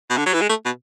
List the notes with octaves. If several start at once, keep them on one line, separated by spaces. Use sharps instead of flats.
B2
D3
F#3
E3
G#3
A3
B2